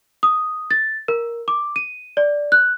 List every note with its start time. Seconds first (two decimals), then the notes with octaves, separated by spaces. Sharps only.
0.23 D#6
0.71 A6
1.08 A#4
1.48 D6
1.76 D#7
2.17 D5
2.52 F#6